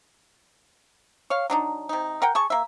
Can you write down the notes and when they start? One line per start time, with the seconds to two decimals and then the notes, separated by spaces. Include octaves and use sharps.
1.30 C#5 F5
1.50 F#3 D4 D#4
1.89 C3 D#4
2.22 A#4 F#5 G5
2.35 G#4 A5 C#6
2.50 A#3 E5